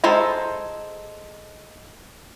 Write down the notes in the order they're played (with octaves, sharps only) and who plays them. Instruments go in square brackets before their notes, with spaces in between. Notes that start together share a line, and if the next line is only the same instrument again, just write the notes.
[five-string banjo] G#3 A4 C5 G#5 A#5